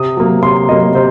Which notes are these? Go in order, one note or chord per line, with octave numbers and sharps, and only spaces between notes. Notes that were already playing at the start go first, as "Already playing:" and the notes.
Already playing: C3 D#6
F#3 A#3
C3 C6
F#3 A#3 D#5
C3 C5